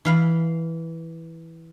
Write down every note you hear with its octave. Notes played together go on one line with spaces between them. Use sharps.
E3 F5 B5